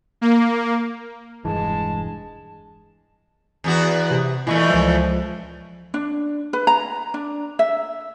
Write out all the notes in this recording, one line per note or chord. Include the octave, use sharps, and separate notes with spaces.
A#3
E1 G2 E3 G#3 A5
E2 B3 F#4
C3
A#2 E3 A3 E4 D#5 C#6
C#2 F3
D4
B4
A#5
D4
E5